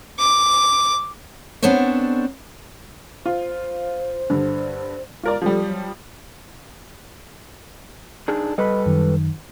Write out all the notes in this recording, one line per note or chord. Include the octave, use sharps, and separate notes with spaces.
D6
B3 C4 D4 A4 C5 C#5
F4 C5
G2 D3
G#3 F4 A#4 D5
F3 G3 A4
F#3
D4 D#4 G#4
G3 A4 B4 D#5 B5
F#2 D#3